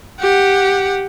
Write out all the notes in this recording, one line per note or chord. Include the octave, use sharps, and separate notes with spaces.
G4 F#5